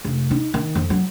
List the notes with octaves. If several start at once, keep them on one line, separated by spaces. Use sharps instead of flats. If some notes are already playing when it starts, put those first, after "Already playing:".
F1
D#4
D#3
F2
F#3